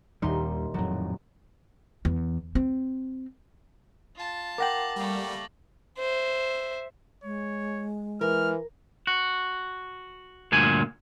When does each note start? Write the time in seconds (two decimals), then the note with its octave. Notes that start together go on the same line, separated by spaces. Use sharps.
0.22 D#1 D#2 G3 D#4 C6
0.74 F2 A2 F#3
2.05 E2
2.55 C4
4.16 F4 A5
4.58 A#4 F#5 G5 D6 A#6 F#7
4.96 G3 A3 A#3
5.98 C5 E5
7.24 G#3 C#5
8.21 E3 A#4 F6
9.07 F#4
10.52 D2 G2 A#2 G#5